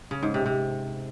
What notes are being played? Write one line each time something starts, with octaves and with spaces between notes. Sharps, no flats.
C#3
G#2
C3
C3